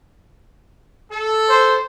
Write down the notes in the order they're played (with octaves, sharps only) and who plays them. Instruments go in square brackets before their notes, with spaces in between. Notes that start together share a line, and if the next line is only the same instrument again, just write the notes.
[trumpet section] A4
[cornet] C5